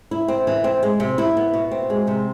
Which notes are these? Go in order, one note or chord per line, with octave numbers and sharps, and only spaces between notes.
E4
C4
E3
C4
G#3
C3
E4
B3
B2
C4
G#3
C3